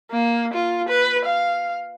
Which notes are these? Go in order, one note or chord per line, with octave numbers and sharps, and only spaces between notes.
A#3
F4
B4
F5